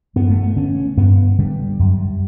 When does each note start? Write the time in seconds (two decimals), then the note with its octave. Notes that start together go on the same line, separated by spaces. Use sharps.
0.16 G2 B3
0.30 A3
0.43 B3
0.56 D3 C#4
0.97 G2 B3
1.39 D3 G3
1.79 F#2